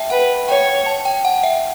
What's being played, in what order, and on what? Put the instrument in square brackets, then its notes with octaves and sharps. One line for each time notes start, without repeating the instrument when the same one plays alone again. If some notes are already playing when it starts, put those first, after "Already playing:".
Already playing: [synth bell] E5 G5 A5
[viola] B4 [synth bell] F#5
[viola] C#5 [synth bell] G5
[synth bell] A5
G5
F#5
E5